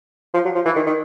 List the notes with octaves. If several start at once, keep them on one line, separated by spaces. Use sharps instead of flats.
F3
F#3
F3
E3
D#3
D#3